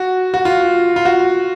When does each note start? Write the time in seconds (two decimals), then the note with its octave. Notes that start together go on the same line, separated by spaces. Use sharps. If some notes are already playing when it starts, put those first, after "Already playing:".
Already playing: F#4
0.34 F#4
0.45 F4
0.96 F4
1.05 F#4